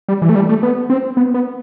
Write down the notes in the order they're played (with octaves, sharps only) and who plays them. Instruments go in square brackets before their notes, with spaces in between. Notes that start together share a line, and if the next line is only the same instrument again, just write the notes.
[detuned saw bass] G3
E3
A3
G3
A3
B3
C4
B3
B3